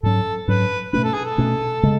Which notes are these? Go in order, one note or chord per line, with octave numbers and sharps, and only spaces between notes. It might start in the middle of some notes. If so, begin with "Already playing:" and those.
G#2 F#3 C#4 A4
G#2 F#3 C#4 B4
B2 A3 C#4 B4
A4
G#4
A4
B2 A3 C#4
C#3 G#3